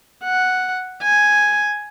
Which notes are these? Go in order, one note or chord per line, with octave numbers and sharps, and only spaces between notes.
F#5
G#5